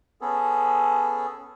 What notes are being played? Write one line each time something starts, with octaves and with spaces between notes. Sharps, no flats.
B3 C#4 G#4 A4